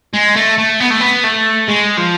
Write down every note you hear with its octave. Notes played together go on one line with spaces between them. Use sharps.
G#3
A3
A3
B3
A3
B3
A3
G#3
F3